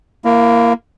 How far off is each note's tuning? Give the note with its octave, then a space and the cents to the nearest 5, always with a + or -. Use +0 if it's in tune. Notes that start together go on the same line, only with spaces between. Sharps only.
A#3 +0 E4 +30